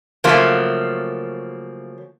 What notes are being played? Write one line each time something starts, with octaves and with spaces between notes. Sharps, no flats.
C#3 F3 F#3 A3 A#3